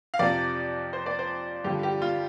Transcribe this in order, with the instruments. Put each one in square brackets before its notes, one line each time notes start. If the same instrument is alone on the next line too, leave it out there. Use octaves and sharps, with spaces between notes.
[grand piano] F5
F2 C3 F3 D5
C5
D5
C5
G2 D3 F3 G4
G4
F4